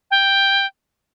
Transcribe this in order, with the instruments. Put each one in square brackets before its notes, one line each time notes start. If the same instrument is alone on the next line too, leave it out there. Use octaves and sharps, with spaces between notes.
[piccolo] G5